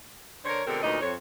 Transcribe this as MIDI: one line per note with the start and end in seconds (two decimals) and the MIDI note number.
0.45 0.61 50
0.45 0.61 70
0.45 0.61 72
0.45 0.61 73
0.67 0.78 47
0.67 0.78 50
0.67 0.78 56
0.67 0.78 60
0.67 0.78 69
0.67 0.78 70
0.83 0.99 38
0.83 0.99 46
0.83 0.99 54
0.83 0.99 63
0.83 0.99 71
0.83 0.99 75
1.01 1.13 41
1.01 1.13 73